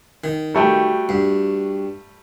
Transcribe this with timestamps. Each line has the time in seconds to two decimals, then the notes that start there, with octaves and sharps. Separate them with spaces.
0.24 D#3
0.55 G3 A3 F#4 G5
1.09 G2